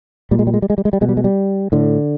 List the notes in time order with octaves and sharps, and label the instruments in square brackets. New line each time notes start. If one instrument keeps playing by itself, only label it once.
[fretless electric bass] A#2 G3
G#3
G3
G#3
G3
G#3
G3
G#3
G3
B2 G#3
G3
G#3
G3
A2 D3